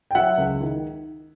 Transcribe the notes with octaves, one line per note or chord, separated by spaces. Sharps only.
G5
F#3 E5 F#5
C#2
D#3